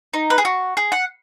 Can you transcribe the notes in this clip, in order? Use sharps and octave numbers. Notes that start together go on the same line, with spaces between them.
D#4
B4
G#4
F#4
G#4
F#5